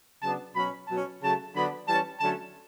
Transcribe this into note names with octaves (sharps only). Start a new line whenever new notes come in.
C#3 F#3 B3 D4 A5
B2 F#3 C#4 B5
B2 F#3 C#4 A5
C#3 F#3 A3 A5
D3 F#3 B3 D4 B5
E3 G3 C#4 A5
D3 F#3 A3 C#4 A5